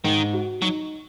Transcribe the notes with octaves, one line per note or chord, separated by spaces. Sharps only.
G#2 D#3
F#4
F#3 D#4